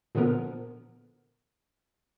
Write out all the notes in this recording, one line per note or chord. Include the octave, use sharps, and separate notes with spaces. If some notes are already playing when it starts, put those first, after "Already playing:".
A#2 D3 F3 B3 A#4